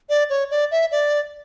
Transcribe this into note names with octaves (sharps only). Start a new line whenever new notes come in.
D5
C#5
D5
E5
D5